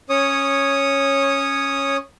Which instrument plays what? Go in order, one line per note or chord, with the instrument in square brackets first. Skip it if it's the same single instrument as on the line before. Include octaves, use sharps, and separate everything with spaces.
[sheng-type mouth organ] C#4 C#5 D#6